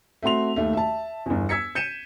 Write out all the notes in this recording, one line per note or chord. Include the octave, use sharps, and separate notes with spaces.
A3 C4 F#4 C6 F7
D#2 A3
E5 A5
G1 E2
E6 G#6 B6 C#7
G6 C#7 D#7 E7